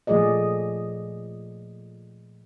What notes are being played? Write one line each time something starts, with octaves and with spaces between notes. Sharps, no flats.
A#2 F3 A3 G#4 D5 D#5